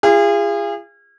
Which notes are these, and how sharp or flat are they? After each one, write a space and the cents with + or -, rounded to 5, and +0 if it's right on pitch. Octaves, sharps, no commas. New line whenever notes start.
F4 -35 G#4 -35